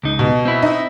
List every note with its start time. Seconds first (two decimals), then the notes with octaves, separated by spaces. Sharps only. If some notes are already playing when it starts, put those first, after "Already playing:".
0.03 C#2 D#4
0.19 B2
0.45 C4 E4
0.62 D#4